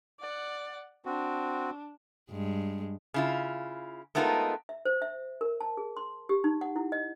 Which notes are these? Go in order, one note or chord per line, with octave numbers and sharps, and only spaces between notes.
D5 F#5
C4 D4 F#4
G2 G#3
C#3 E4 F4
G#3 A3 B3 D#4 F4 A#4
E5
C5
E5
A#4
A5
G#4
C6
G4
D#4
F#5
E4
D#5